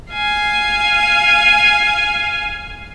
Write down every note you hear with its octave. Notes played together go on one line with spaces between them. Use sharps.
F5 G#5